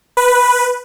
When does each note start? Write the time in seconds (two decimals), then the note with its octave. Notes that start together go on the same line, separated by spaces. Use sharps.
0.17 B4